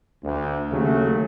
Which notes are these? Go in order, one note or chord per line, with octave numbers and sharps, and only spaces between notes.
D2
D#2 C#3 F#3 A3